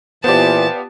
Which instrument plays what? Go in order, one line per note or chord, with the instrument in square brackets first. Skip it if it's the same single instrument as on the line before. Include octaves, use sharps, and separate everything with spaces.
[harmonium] A#2 E3 [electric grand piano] B3 F4 G4 [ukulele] C5 D5 [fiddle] A5